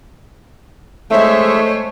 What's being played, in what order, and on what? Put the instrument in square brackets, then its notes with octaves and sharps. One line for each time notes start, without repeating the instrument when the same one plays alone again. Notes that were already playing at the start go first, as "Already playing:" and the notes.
[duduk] G#3 [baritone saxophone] A3 [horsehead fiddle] C5 C#5 [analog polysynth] E5